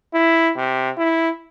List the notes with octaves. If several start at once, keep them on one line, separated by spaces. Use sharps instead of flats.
E4
C3
E4